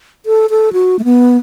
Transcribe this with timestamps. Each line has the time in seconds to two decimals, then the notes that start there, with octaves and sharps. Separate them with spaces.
0.26 A4
0.50 A4
0.73 F#4
0.99 A3
1.04 B3